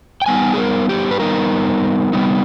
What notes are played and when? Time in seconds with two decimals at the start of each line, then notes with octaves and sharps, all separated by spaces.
0.22 G5
0.26 G3 B3 D#4 G#5
0.54 G#4
0.58 A#4
0.89 G4
1.11 B4
1.20 G3 B3 D#4 A#4
2.13 G3 B3 D#4